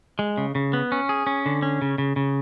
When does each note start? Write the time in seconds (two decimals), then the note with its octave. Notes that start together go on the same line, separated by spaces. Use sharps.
0.19 G#3
0.38 C#3
0.55 C#3
0.73 B3
0.92 C#4
1.09 G#4
1.27 C#4
1.46 D3
1.62 C#4
1.82 C#3
1.98 C#3
2.16 C#3